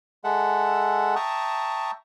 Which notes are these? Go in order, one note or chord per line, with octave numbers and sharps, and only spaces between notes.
G#3 A4 E5 F#5
E5 G5 A5 A#5 C#6 D#6